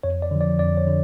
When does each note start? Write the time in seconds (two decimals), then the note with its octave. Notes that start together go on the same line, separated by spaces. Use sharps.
0.03 F2 C#5
0.22 D5
0.31 D3 F3
0.41 D5
0.59 F2 D5
0.77 C#5
0.87 D3